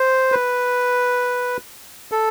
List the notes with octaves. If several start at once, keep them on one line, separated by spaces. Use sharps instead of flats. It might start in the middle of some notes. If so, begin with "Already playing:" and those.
Already playing: C5
B4
A4